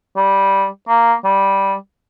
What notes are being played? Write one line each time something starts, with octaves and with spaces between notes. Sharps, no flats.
G3
A#3
G3